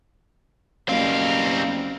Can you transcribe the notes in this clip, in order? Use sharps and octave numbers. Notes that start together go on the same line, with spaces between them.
F#1 B2 G3 C4 A#4 F5